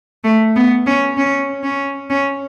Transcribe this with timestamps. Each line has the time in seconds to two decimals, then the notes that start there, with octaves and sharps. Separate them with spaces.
0.24 A3
0.56 B3
0.86 C#4
1.17 C#4
1.63 C#4
2.10 C#4